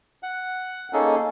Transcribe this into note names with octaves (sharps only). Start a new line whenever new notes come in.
F#5
A#3 C#4 D#4 G#4 A4